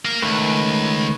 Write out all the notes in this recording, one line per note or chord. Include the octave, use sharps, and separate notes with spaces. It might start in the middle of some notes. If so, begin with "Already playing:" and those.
A#4 F5
C#2 D#3 A3 B4